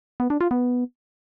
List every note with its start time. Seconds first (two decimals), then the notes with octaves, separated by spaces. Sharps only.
0.20 B3
0.30 D4
0.41 F4
0.51 B3